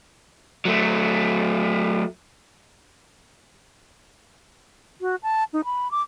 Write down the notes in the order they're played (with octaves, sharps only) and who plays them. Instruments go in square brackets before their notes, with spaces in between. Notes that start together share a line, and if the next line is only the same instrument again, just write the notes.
[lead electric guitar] F#3 A3
[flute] F#4
A5
D#4
B5
D6